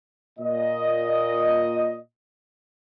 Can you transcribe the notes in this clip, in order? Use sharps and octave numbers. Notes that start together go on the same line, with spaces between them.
A#2 D#5